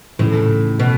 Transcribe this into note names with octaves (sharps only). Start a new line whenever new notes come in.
D#2 A2 C#3 E3 A3
B2